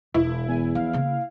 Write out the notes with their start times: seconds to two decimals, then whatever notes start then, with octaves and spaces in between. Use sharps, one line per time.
0.14 E1 E4
0.48 E2 G#5
0.75 F3 F5
0.93 C#3 A#3